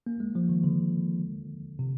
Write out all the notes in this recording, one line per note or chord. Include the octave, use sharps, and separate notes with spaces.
A#3
G#3
F3
D#3
D3
C3